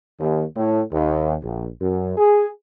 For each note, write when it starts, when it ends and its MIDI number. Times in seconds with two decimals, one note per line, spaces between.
0.20 0.43 39
0.56 0.82 45
0.92 1.36 39
1.43 1.67 34
1.80 2.13 42
2.16 2.47 68